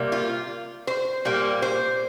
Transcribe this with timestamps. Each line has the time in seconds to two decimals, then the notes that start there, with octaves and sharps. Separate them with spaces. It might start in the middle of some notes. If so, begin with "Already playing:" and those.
Already playing: C3 G3 A#3
0.12 F4
0.87 C5
1.25 A#2 G3 A#3
1.62 C5